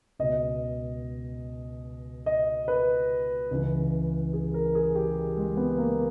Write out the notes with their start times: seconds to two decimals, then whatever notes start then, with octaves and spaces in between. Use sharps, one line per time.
0.19 C#2 B2 D#5
2.26 D#5
2.68 B4
3.51 C#2 C#3 E3
4.33 G#4
4.54 A#4
4.75 G#4
4.96 G4
5.37 G#3
5.57 B3
5.78 A#3